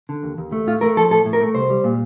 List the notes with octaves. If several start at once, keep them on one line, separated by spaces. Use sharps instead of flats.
D3
D#2
D#2
A3
A2 F4
A3 A#4
F3 A4
A2 A4
A2
A#4
A3
C2 C5
G3
A#2